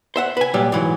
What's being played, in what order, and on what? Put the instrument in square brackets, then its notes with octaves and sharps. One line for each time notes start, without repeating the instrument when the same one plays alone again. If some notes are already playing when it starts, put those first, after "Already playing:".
[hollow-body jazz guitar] C5 E5 F#5
B4 G#5
A#2 F#3 G3 G4
G#2 E3 F#3